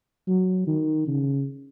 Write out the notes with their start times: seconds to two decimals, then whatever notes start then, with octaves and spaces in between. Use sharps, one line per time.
0.27 F#3
0.67 D#3
1.07 C#3